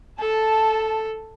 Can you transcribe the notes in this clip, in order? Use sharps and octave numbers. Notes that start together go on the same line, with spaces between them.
A4 A5